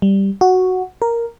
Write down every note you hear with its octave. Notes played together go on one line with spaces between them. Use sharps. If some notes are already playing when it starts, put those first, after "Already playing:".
G3
F#4
A#4